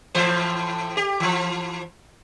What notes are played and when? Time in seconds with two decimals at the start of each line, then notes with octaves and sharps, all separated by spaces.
0.15 A2 E3 C5
0.97 G4
1.20 E3 F3